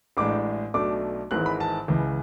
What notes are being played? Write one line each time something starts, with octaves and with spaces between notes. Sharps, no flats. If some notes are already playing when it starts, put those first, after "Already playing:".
A1 A2 G#3 D4 D6
B1 B2 A3 D4 D6
G#1 G#2 E3 G#3 F#6
B5
A5
C#2 C#3 E3